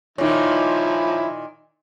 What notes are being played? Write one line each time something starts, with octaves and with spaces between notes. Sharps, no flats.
A#2 D#3 F3 D#4 E4 C#5